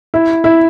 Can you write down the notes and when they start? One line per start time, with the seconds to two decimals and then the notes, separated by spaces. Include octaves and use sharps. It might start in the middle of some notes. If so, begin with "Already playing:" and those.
0.14 E4
0.44 E4